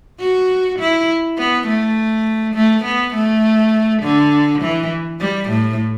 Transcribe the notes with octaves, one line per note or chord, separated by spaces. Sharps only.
F#4
E4
B3
A3
A3
B3
A3
D3
E3
G3
A2